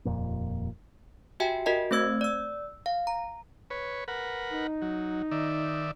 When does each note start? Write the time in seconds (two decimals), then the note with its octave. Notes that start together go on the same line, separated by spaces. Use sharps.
0.05 D#1 F2 A#2
1.40 F#4 G4 E5 G5 G#5
1.66 F#4 A#4 D#5 A5
1.91 A3 C4 C5 E6 G#6
2.21 D5 E6
2.86 F5
3.07 A#5
3.70 B4 C#5
4.08 A#4 B4 F#5
4.52 D#4
4.82 F#3
5.31 D#3 D5 E5